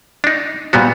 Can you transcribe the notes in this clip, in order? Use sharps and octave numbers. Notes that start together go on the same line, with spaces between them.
D4 D#4
A#2 G3 B3 F#4